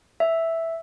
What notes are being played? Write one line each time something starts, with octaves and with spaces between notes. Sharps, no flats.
E5